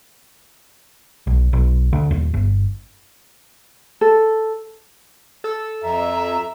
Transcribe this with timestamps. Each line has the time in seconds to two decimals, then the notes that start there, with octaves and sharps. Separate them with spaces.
1.27 B1
1.53 B1
1.93 D2
2.11 D#1
2.34 G1
4.01 A4
5.44 A4 E6
5.83 F2 E5 A#5